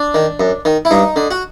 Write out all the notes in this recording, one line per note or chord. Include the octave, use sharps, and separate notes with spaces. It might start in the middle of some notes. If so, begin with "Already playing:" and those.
Already playing: D4
D#3
F#2
D#3
E4
G2 D#4
D3
F#4